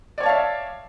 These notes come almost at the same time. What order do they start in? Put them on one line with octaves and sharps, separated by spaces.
D5 C#5 A5 F5 E5